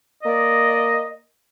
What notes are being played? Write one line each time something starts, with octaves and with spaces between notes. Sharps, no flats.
A#3 D5 D#5